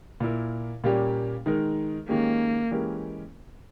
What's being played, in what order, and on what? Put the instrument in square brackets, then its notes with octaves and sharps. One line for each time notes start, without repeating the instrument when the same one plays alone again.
[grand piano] A#2 A#3 E4 A#4
A#2 G3 A#3 C#4 G4
D#3 G#3 D#4 A#4
[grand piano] D#3 G#3 C#4 G4 [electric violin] A#3
[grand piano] E3 G#3 C#4 G4 A#4